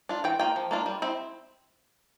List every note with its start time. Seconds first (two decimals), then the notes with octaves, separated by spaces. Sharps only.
0.09 D4 F4
0.24 E3 G5
0.39 A#3 F4 G5
0.56 F3
0.71 A#3 D4 F4
0.86 G3
1.02 C4 E4